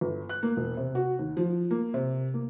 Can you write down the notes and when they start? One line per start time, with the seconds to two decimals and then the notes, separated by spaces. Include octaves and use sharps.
0.01 G1
0.29 F#6
0.43 A#3
0.57 E1
0.77 C3
0.95 F#4
1.19 D#2
1.37 F3
1.71 A#3
1.94 C3
2.34 A#3